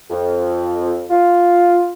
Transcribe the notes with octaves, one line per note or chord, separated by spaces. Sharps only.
F2
F4